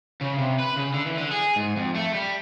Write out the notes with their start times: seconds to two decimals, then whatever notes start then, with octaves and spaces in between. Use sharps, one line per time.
0.21 C#3
0.38 C3
0.59 B4
0.76 C#3
0.94 D3
1.06 E3
1.17 D3
1.31 G#4
1.56 G#2
1.77 F2
1.96 A3
2.14 G3